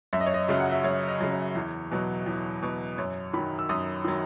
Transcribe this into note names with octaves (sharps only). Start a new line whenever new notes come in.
F#2 E5
D#5
C#5
D#5
C#3 F#3 E5
F#5
E5
F#2 C#5
D#5
C#3 F#3
C#5
E2
B2 F#3
E2
B2 F#3
F#2 C#5
D#3 F#3 B5
E6
F#2 D#6
D#3 F#3